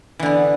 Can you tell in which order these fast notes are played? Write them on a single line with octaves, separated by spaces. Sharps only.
E3 D3 B3